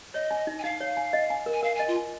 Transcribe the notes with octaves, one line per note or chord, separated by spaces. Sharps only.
C#5 D#5
G#5
D#4
G#5
D#4 F5
C#5
G#5
D#5
G#5
A#4
G#5
A#4 F5
G#5
D#5
F4
G#5